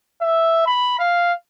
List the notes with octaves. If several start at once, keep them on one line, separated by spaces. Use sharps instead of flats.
E5
B5
F5